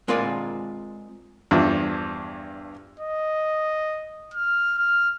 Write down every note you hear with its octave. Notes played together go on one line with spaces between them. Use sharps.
G#3 C4 F4 A#4 B4 D5
E2 G2 F3 D4
D#5
F6
F6